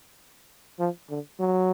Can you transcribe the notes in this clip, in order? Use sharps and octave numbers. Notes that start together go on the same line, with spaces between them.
F3
D3
F#3